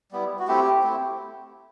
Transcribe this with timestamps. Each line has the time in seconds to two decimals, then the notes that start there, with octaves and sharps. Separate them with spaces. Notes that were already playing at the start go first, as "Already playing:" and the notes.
0.12 G3 B3 E4
0.39 F#4
0.48 A3 C4 E4 G4
0.83 A3 C4 E4